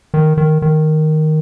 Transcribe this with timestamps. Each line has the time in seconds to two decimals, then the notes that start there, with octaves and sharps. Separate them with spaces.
0.14 D#3
0.37 D#3
0.62 D#3